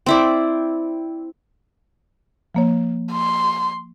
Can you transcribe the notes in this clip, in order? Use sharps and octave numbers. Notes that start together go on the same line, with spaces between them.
C4 E4 D5
F3 A#3 C#5
C6